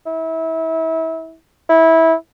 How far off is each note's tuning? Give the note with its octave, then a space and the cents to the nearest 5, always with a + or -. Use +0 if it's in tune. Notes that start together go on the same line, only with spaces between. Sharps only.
E4 -30
E4 -20